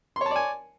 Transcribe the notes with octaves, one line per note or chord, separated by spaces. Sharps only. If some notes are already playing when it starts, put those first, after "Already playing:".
C#5 D5 G#5 A5 C6